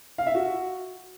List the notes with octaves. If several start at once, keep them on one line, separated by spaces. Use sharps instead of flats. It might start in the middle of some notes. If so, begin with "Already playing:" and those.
F5
E5
F#4